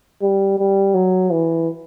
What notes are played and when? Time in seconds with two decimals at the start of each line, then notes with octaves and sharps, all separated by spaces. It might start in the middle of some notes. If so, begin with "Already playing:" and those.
0.21 G3
0.58 G3
0.95 F#3
1.30 E3